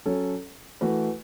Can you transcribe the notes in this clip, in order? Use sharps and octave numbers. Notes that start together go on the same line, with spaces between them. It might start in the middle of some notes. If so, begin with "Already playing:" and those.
F#3 C#4 A4
E3 A3 F#4 B4